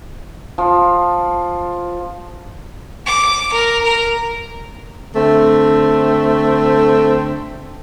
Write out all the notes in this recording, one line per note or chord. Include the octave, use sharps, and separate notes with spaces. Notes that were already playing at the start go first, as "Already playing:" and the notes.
F3
D6
A#4
A#4
D3 A3 C4